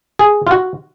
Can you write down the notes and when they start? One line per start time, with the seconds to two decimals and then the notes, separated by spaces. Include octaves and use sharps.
0.19 G#4
0.47 F4
0.51 F#4